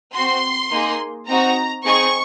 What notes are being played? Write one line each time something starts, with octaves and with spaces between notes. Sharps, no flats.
C4 F#4 C6
A#3 D#4 G#4
C4 D#4 F#4 A#5
C4 D#4 G#4 C#6